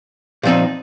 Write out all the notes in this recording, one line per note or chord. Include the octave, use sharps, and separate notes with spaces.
A#2 F3 C4 D#4